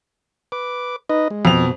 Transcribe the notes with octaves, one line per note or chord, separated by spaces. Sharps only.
B4 D6
D#4 B4 D#5
G#3
F2 B2 F7